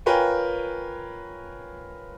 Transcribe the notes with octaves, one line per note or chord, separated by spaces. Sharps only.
F4 A#4 B4 C#5 G5 G#5